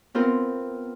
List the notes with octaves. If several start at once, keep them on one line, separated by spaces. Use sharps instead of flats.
B3 C4 F4 A#4